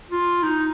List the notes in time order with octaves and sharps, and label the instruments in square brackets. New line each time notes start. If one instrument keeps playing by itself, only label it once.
[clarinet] F4
D#4